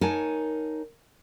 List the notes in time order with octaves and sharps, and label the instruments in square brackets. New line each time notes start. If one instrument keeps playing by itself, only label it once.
[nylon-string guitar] D#4 A#4 C#5 F#5 G#5 A5